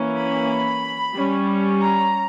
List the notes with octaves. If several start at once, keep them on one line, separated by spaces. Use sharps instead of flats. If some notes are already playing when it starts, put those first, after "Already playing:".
Already playing: E3 A#3 C#4
B5
G3 C#4
A#5